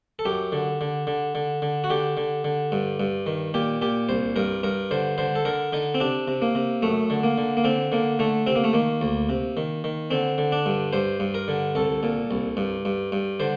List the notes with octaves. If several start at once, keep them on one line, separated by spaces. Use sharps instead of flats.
A4
F#2 G4
D3
D3
D3
D3
D3
F#4
D3 G4
D3
D3
G2
G2
D#3
A#2 G4
A#2 G4
C2 C5
G2 A#4
G2 A#4
D3 C5
D3 C5
A4
D3 A#4
D3 D#4
C4
C3 D4
C3
A#3
C3
F#2 A3
D3
A#3
D3
A#3
D3 C4
D3 A#3
D3 A3
C3 C4
A#3
A3
D#3 A#3
D2
C3
D#3
D#3
D3 C4
D3
D4
G2
G2 C5
G2
A#4
D3
C2 A4
A#2
C2
G2
G2
G2
D3 C5